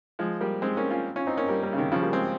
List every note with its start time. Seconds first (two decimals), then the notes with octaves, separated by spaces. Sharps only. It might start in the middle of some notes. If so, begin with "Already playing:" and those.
0.19 F3 G#3
0.40 G3 A#3
0.62 G#3 C4
0.77 A#3 C#4
0.91 C#4 F4
1.16 C#4 F4
1.27 C4 D#4
1.37 A#3 C#4
1.48 G3 A#3
1.62 G3 A#3
1.73 C#3
1.78 C3 D#3
1.92 C#3 F3
2.02 G3 A#3
2.13 G#3 C4